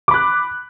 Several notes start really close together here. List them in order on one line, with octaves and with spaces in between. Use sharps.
D6 B5 F#6